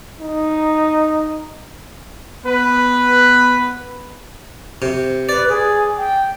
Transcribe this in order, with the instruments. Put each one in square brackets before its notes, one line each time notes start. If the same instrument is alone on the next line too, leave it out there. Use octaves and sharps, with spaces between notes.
[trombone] D#4
[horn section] B3 B4
[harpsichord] C3
[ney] B4 [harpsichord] D5
[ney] G#4
G5